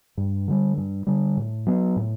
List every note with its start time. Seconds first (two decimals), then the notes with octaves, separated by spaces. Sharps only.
0.17 G2
0.48 D3 G3
0.78 G2
1.07 D3 G3
1.37 A2
1.67 F#3 B3
1.96 A2